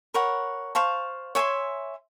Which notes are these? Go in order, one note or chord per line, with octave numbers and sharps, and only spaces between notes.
A#4 C#5 F#5 B5
C5 F5 A5 C#6
C#5 E5 G#5 C6